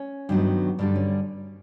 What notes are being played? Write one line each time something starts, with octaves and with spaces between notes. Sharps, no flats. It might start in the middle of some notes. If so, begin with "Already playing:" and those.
Already playing: C#4
G2 D#3 F#3 B3
G2 D3 G3 D4
C#4